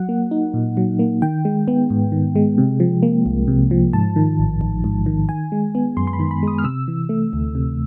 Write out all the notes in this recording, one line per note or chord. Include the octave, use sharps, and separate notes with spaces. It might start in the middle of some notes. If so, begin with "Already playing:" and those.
Already playing: F#3 F#5
A#3
D#4
A#2
F#3
A#3
D#3 G5
G#3
B3
G#2
D#3
G#3
C3
F3
A#3
C2
C3
F3
G#2 A5
D#3
A1
A1
G#2
D#3
D#3 G#5
G#3
B3
F#2 C6
C6
B5
D#3
B5
G#3 D#6
F6
C3 E6
E3
A3
D2
C3